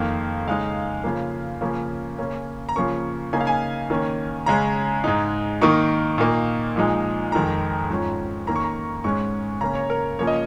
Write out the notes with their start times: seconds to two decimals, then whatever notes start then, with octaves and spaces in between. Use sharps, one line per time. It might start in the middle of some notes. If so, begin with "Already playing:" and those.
Already playing: F2 D#3 A#3 F5
0.47 C#3 G#3 D#4 F5
1.04 C#3 F3 A#3
1.61 C#3 F3 A#3 C#4
2.18 C#3 A#3 C#4
2.69 A#5
2.76 C#3 F3 A#3 C#4 C#6
3.33 C#3 A#3 D#4 G#5
3.41 F5
3.47 G#5
3.90 D#3 A#3 C#4
4.46 C#3 G#3 C#4 A#5
5.04 G#2 G#3 D#4
5.61 D#3 A#3 D#4 C#6
6.18 A#2 A#3 D#4
6.76 A#2 F3 G#3 D#4
7.32 F2 D#3 G#3 A#5
7.90 G#2 F3 C#4
8.47 D#3 A#3 C#4 A#5
8.56 C#6
8.64 A#5
9.04 G#2 G#3 C#4 C#6
9.61 C#3 A#3 C#4 A#5
9.75 C#5
9.90 A#4
10.19 C#3 F3 A#3 C#4 C#5
10.27 D#5